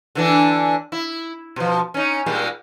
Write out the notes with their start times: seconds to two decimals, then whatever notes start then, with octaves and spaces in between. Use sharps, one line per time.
0.15 D3 E3 D4
0.92 E4
1.56 B2 F3
1.94 C#4 D#4
2.26 A#2 G3 G#3